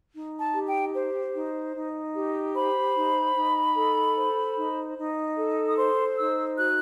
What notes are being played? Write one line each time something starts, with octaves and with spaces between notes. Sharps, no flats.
D#4
A5
G4
G5
C5
D#4
D#4
G4
C5 B5
D#4
D#4
A4
C5
D#4
D#4
A4
D#6
C5 C6
D#4 E6
F#4 F#6